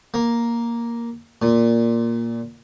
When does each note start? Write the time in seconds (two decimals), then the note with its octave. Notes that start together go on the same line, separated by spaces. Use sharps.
0.14 A#3
1.42 A#2